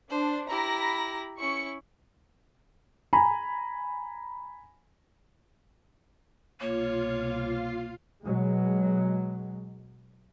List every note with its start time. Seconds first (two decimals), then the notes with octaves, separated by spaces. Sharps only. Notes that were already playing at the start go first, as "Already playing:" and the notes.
0.10 D4 C5
0.49 E4 G4 A#5 B5 A#6
1.39 C#4 E4 C#6 C#7
3.13 G#5 A#5 B5
6.60 C2 B2 A#3 F4 C#5 F5
8.25 B2 F#3 G#3